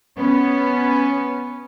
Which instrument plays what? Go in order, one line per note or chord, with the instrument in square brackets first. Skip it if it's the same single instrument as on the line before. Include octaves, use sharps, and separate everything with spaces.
[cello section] B3 C#4